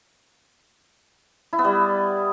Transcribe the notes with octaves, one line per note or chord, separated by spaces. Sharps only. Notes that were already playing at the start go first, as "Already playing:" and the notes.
E4
B3
G3